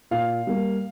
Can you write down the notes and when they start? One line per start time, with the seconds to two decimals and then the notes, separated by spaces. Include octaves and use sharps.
0.11 A#2 F5
0.47 G3 A#3